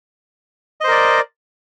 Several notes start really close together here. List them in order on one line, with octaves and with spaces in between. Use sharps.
D#5 C5 A#4 D5